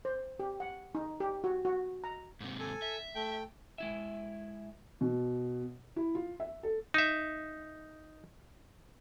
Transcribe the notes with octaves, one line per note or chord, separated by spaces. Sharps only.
C5
G4
F#5
D#4
G4
F#4
F#4
A#5
G#2 C3
A4 G#5
E5
A3 G5
G#3 E4 E5
B2
E4
F4
E5
A4
D#4 E5